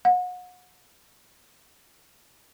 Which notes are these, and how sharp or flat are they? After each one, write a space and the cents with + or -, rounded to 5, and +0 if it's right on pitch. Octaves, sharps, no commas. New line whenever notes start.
F#5 -35